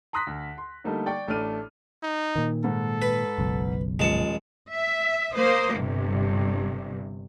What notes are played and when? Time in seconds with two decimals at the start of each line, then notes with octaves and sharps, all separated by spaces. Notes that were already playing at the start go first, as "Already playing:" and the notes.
0.13 A#5 C6 D#6 F#6 A#6 B6
0.27 D2
0.58 C6
0.84 D3 G3 A3 A#3 D#4
1.06 D5 G5 C#6
1.28 A1 A3 D4 D5 F6 D#7
2.03 D#4
2.36 A#2 D#3
2.64 G#2 A4
3.02 B4
3.38 F#1 B1
3.99 D#1 F3 G#3 A5 C#7
4.72 E5
5.35 A#3 C5 D#6
5.75 G1 G2 C3